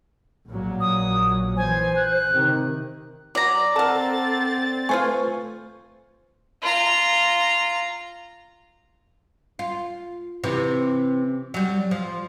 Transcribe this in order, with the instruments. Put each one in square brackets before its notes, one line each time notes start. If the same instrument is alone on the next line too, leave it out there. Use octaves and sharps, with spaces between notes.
[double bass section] A#1 A#2 F#3
[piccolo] D#6
[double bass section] E3 [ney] C5 [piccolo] G#5
[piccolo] F#6
[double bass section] C3 D#3
[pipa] F#3 [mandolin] D5 A#5
[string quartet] C4 A6 [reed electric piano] A4 F#5 E6 [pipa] A#4 A5
[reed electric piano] A3 B4 C#6 [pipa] F4 C5 G#5
[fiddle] F4 A#5
[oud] F4
C3 E3
F#3 G3
F3